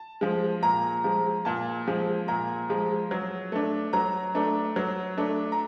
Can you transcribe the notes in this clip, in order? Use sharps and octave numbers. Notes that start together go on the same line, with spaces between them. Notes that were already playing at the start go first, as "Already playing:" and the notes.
Already playing: A5
F3 G#3
A#2 A#5
F3 G#3
A#2 A5
F3 G#3
A#2 A#5
F3 G#3
F#3
A3 D4
F#3 A#5
A3 D4
F#3
A3 D4
A#5